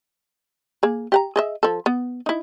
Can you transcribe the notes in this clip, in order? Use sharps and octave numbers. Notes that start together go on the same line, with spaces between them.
A#3 G#4
G4 F#5 A#5
G#4 D#5 E5
F3 A4
B3
D#4 E4